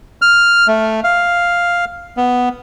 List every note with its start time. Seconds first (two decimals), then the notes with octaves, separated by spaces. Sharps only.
0.22 F6
0.67 A3
1.04 F5
2.17 B3